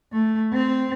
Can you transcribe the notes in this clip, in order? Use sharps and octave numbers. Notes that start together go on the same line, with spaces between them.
A3
C4